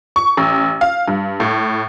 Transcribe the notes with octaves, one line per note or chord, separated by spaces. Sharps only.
C#6
A1
F5
G2
A2